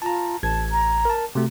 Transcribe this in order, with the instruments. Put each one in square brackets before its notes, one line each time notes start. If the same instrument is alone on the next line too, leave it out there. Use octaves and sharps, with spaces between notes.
[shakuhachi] F4 [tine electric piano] A5 A#5
[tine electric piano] A1 G#6 [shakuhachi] A5
[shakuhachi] A#5
[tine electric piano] A#4 A5
[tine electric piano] C3 A3 [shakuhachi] F#4